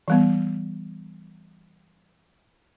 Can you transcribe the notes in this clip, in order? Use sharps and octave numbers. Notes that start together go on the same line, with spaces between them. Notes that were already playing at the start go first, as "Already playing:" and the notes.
E3 G3 B3